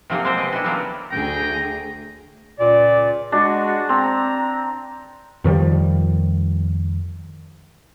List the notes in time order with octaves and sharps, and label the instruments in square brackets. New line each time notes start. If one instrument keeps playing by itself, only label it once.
[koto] C3 F3 F#3 A#3 G4 G#4
F3 G#3 A#3 C4 G4 C5
B2 D#5
D4 E4 F#4
C#3 E3 F#3 G3 A#3 B3
[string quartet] D2 G#4 [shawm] G5 [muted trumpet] A#5
[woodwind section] C#2 A#2 D5
[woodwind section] G#3 F#4 [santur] D4
[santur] C4 [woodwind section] A#5
[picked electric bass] F2 D#3 F3 G3